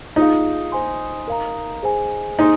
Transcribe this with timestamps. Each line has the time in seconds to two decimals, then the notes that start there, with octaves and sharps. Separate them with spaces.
0.16 D#4 F4 G#4 F5
0.72 C5 G#5 C6
1.27 A#4 F5 A#5
1.83 G#4 C5 G#5
2.38 D#4 G#4 C5 G#5 C6